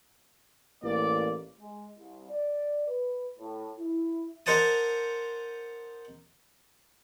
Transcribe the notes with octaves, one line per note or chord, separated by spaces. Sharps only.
A1 A#3 D5
G#3
C2
D5
B4
A2
E4
D#4 A#4 C5 F#5 A5 D#6